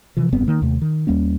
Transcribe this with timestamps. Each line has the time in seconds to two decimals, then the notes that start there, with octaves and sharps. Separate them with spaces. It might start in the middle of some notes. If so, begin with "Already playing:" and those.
0.17 C3 E3 F3
0.32 F1 G2 B3 C4
0.47 D#3 A#3
0.62 D#2 C3 A3
0.82 D#3
1.07 D#2 G3 A#3 C#4